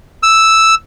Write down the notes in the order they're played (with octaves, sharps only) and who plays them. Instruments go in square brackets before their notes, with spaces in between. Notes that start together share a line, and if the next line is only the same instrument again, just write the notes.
[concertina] E6